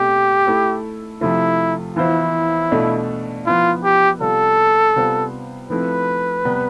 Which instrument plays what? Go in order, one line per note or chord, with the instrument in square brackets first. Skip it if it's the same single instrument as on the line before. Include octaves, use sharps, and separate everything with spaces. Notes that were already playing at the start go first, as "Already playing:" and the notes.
Already playing: [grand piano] B2 A3 C4 [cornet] G4
[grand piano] A3 E4 A4
[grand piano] C3 F3 A3 [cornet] E4
[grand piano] E3 B3 F4 C5 [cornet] E4
[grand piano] B2 A3 D4 F4 A4
[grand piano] F3 B3 E4 [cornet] F4
[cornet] G4
[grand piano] C3 G3 B3 F4 B4 [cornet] A4
[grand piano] C3 G3 B3 F4 C5
[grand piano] F3 A3 C4 E4 [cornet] B4
[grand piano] C3 G3 B3